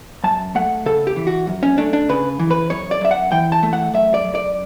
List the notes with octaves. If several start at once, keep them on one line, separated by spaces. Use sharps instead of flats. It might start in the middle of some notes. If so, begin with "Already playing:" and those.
F#2 A5
A3 F#5
C#3 A4
G4
E3
F#4
F#2
C#4
A3 D4
D4
C#3 B4
E3
B4
F#2 C#5
D5
F#2 E5
F#5
E3 G5
A5
A3
F#5
F#2 E5
D5
F#2
D5